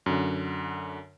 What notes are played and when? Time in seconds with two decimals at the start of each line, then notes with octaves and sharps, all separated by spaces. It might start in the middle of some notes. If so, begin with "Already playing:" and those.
0.06 F#2 D3